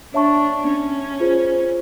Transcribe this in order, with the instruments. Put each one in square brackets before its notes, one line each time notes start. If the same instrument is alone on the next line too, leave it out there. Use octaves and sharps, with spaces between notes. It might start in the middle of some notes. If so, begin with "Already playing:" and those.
[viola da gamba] D4 [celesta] C#5 E5 A5 C#6
[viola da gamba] C#4
[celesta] F4 G#4 C5